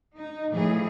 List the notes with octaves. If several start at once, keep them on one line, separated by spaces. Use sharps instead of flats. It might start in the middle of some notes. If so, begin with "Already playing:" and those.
D#4
A2 E3 F3 G#4